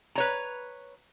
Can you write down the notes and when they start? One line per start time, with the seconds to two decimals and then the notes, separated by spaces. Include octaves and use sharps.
0.15 B4 C#5 A#5